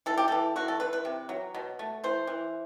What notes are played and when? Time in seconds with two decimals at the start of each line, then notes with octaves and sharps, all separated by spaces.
0.06 E3 A4
0.18 G4
0.28 E3 A4
0.56 E3 F#4
0.68 A4
0.80 E3 B4
0.93 B4
1.05 C3
1.29 F#3
1.55 B2
1.79 A3
2.04 E3 C5
2.27 E3